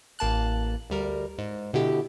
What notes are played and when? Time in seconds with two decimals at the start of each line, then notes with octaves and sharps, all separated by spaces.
0.19 A1 A#3 A5 F#6
0.90 D2 G3 A#4
1.38 G#2
1.73 B2 D3 E4 G4